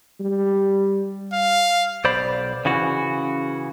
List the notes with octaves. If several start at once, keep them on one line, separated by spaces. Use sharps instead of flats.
G3
F5
B1 C5 D5 B5
C#3 E3 F#4